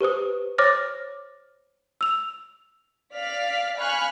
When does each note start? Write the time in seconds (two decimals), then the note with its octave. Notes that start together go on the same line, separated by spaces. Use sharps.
0.01 G4 B4 C5 D#6
0.58 C5 C#5 D6 F6 A6 A#6
2.01 E6 F7
3.15 D5 F5 F6 B6
3.77 F5 G#5 B5 C#6 F6 F#6